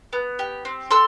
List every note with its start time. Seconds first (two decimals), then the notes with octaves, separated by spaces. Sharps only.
0.13 B3
0.39 G4
0.65 C4
0.91 A4 C6 E6